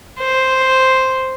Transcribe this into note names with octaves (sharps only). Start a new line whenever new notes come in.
C5